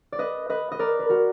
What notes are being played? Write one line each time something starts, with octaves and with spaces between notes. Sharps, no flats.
D5
B4 D#5
B4 D#5
D#5
A#4 D5
B4
F#4 A#4